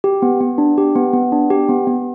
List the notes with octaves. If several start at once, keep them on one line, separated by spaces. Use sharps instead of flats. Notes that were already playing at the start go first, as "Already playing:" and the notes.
G4
B3
B3
D4
G4
B3
B3
D4
G4
B3
B3